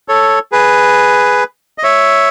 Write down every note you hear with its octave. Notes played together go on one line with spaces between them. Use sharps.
A4 C#5
G#4 B4
D#5
C#5 E5